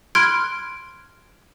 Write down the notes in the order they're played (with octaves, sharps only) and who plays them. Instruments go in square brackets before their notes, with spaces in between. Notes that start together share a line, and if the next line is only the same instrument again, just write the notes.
[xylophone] B5 C6 F6 F#6 G#6 D7